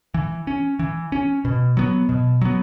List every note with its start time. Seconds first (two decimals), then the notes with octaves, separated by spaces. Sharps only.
0.14 E3
0.47 C#4
0.79 E3
1.12 C#4
1.45 B2
1.77 F#3 B3
2.09 B2
2.41 F#3 B3